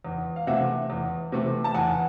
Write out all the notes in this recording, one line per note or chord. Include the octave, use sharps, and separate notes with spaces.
E2
F5
C3 E3 A3 E5 F#5
E2
C3 E3 A3
A5
E2 F#5 G#5